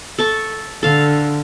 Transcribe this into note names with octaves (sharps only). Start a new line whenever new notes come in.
A4 A5 C#6
D3 A4 F5